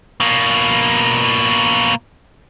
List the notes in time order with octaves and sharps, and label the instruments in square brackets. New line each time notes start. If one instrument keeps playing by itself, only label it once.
[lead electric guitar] B2 A#3